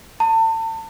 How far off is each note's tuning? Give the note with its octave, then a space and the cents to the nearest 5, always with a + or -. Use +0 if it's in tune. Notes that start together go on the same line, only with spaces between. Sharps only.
A5 +35